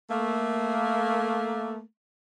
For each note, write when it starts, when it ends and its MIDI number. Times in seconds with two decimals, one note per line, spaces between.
0.09 1.80 57
0.09 1.80 58